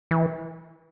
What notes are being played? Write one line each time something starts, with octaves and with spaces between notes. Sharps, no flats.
E3